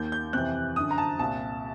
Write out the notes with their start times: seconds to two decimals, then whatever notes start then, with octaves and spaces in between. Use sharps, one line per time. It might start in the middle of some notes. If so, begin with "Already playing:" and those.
Already playing: D#2 D#3 G6
0.12 G6
0.33 F2 C3 E3 F#6
0.76 F#2 D3 D#6
0.91 A#5
0.98 A5
1.19 C2 A#2 A5